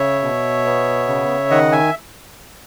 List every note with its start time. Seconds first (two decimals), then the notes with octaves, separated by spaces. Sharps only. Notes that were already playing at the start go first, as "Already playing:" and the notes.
Already playing: C#3 C#5 E5
0.22 B2
0.65 B3
1.08 C#3
1.50 D#3 D#5 F#5
1.72 E5 G#5